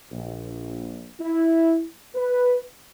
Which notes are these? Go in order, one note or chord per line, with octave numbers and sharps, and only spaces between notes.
A#1
E4
B4